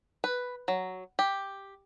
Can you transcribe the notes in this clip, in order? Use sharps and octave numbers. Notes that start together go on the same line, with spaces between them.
B4
F#3
G4